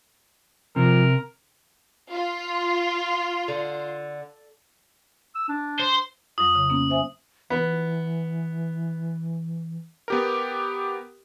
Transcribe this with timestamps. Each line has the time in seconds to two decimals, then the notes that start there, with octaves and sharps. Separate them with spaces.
0.76 C3 F3 A#4
2.12 F4
3.48 D3
5.35 E6
5.48 D4
5.80 C5
6.38 F2 F#3 D#6
6.55 C#3
6.70 A#3 B3 C#4
6.90 C5 E5 G#5
7.50 E3 B3
10.08 B3 G4 A#4